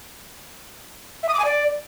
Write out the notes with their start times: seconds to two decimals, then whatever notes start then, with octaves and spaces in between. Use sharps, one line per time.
1.23 E5
1.29 D#6
1.34 D6
1.39 G#5
1.45 D5